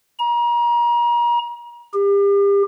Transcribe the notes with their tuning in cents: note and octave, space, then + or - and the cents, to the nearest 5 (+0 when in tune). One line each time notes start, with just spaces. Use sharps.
A#5 +35
G4 +35